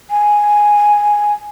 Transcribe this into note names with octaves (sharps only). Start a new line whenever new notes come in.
G#5